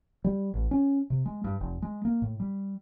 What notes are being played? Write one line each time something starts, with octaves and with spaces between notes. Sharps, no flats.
G3
A1
C#4
C3
G#3
G2
F1
G#3
A#3
A2
G3